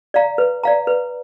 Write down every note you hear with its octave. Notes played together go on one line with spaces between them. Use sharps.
D5 F5 A#5
B4
D5 F5 A#5
B4